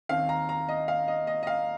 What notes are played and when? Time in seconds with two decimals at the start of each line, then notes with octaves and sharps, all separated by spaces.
0.09 D#2 D#3 C4 F5
0.29 A#5
0.49 A#5
0.69 D#5
0.88 F5
1.08 D#5
1.27 D#5
1.43 D#5
1.47 F5